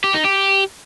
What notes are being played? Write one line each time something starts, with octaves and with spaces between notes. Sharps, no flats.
G4
D#4
G4